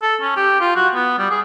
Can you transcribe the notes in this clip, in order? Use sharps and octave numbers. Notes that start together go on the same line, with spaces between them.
A4
C#4
G4
F4
F#4
B3
G3
G#4